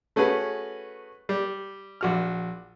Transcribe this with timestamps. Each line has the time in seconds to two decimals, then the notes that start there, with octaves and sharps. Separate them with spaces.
0.16 A3 C#4 F#4 G#4 B4
1.29 G3
2.01 A#1 F#4 F6